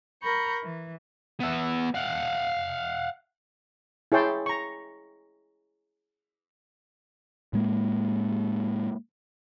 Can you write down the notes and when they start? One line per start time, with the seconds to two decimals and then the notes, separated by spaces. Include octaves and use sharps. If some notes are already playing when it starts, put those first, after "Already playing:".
0.22 A#4 A#5 B5 C#6 G6
0.63 E3
1.40 B3 E5
1.94 F5 F#5
4.12 E4 G#4 C#5 G5 A5 C6
4.46 A#5 C#6
7.53 A2 G#3 A#3